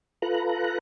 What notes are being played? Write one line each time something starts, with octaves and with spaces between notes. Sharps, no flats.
F4 A4 B4 A#5 F#6